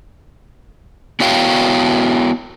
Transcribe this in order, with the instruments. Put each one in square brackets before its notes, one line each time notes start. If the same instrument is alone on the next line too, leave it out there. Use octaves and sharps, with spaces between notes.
[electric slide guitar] B3 E4 F#4 C#5 F5 G5